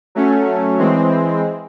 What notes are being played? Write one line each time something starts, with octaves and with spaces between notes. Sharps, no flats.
F#3 A3 C#4
E3 G#3 C4